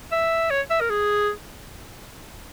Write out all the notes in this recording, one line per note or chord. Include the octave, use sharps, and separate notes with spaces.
E5
C#5
E5
A#4
G#4